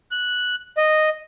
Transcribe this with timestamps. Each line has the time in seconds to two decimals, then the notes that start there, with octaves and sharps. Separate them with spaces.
0.11 F#6
0.77 D#5